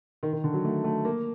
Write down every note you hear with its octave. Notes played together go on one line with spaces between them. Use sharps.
D#3
D#3
D3
F#3
A3
A3
A#3